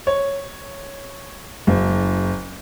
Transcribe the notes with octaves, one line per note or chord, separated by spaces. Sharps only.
C#5
F#1